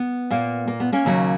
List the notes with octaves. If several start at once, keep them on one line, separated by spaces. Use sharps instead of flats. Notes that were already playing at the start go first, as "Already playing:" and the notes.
Already playing: B3
A#2 A#3
A#3
B3
A#3 C#4
D#2 C#3 F#3 A#3